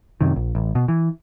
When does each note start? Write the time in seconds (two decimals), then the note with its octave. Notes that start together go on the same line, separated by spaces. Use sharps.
0.21 F#2 C3 D#3
0.36 A#1
0.55 A1
0.75 B2
0.88 E3